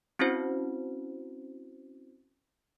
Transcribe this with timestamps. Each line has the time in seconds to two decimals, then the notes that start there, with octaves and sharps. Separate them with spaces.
0.19 C4 C#4 E4 F#4 C5